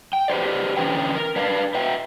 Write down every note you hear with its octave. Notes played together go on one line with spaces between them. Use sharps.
G5
G4 B4 C5 D5
D3 E3 C#4 G4 B4 G5
A#4
D4 B4 F5
B4 E5 G5